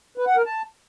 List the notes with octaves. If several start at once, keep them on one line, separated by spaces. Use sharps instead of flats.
B4
F#5
A#4
A5